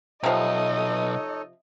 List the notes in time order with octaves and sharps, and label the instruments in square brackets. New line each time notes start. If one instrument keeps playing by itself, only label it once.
[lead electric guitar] B1 [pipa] C3 F3 [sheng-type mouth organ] D#4 A4 C#5 [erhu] D#5